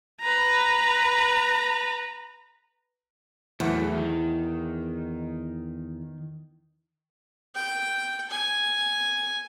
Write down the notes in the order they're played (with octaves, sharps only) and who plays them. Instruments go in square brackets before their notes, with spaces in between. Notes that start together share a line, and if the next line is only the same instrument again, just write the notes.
[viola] B4 A#5
[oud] E2 [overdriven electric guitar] F#3 A3
[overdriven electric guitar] D#3
[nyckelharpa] G5
G#5